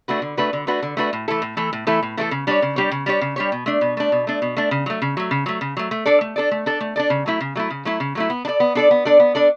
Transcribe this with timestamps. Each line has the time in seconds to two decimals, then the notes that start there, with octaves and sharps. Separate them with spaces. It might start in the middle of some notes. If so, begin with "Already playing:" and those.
0.08 A3 D4 F#4 B4
0.22 D3
0.37 A3 D4 F#4 B4
0.53 D3
0.67 A3 D4 F#4 B4
0.82 D3
0.97 A3 D4 F#4 B4
1.13 A2
1.28 E3 A3 E4 A4
1.42 A2
1.57 E3 A3 E4 A4
1.73 A2
1.87 E3 A3 E4 A4
2.02 A2
2.17 E3 A3 E4 A4
2.31 C#3
2.47 G3 D4 G4 C#5
2.62 C#3
2.76 G3 D4 G4 C#5
2.91 C#3
3.06 G3 D4 G4 C#5
3.21 C#3
3.36 G3 D4 G4 C#5
3.52 B2
3.66 A3 D4
3.81 B2
3.97 A3 D4
4.12 B2
4.27 A3 D4
4.42 B2
4.57 A3 D4
4.71 C#3
4.86 F#3 A3
5.02 C#3
5.17 F#3 A3
5.31 C#3
5.46 F#3 A3
5.61 C#3
5.77 F#3 A3
5.91 A3
6.06 D4 A4 D5
6.21 A3
6.36 D4 A4 D5
6.51 A3
6.66 D4 A4 D5
6.81 A3
6.96 D4 A4 D5
7.10 C#3
7.26 F#3 A3 E4
7.40 C#3
7.56 F#3 A3 E4
7.70 C#3
7.85 F#3 A3 E4
8.00 C#3
8.15 F#3 A3 E4
8.30 B3
8.45 D4
8.47 A4 D5
8.60 B3
8.75 D4 A4 D5
8.91 B3
9.05 D4 A4 D5
9.20 B3
9.35 D4 A4 D5